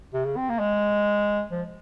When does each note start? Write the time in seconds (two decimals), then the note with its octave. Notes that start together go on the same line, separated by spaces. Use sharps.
0.14 C3
0.25 C#3
0.37 C4
0.49 A#3
0.59 G#3
1.51 F3